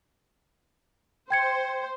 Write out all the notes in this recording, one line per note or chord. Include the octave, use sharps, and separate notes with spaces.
C5 G5 G#6 C#7